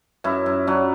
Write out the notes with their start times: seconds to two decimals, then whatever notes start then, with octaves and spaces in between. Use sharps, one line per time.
0.24 F#2 E4
0.46 F#2
0.67 F#3 D4